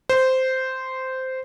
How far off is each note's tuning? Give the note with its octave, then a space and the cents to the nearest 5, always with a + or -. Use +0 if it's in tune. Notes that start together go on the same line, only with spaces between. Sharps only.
C5 -10